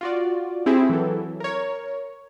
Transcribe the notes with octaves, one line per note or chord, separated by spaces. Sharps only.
F4 F#4 D5
C4 E4 G4 G#4
E3 F#3 A4
A#4 C#5